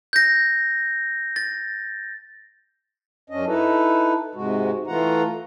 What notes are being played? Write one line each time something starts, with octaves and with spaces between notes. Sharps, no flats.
G6 A#6
A6
F#2 C#4 D4 D#5
D#4 E4 A4 B4
G#2 C3 G#3 F#4
E3 A3 F4 F#5 A#5